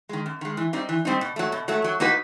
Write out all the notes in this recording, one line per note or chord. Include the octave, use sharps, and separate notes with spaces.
D#3 G#3
F#2
D#3 G#3
E3
G3 C4 D#4
E3
G3 C4 D#4
B2
F#3 A3
B2
F#3 A3
F#3
A#3 D#4 F#4 B4